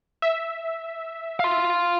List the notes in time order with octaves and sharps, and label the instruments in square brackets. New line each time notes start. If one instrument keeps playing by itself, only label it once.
[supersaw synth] E5
[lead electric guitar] F5 C6